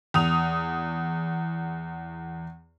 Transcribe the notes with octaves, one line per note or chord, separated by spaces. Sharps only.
E2 D#6 F7